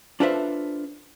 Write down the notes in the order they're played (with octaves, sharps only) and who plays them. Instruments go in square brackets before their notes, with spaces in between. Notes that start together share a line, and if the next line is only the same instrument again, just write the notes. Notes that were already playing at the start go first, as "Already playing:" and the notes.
[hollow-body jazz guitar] D4 F4 A4 B4 C5 E5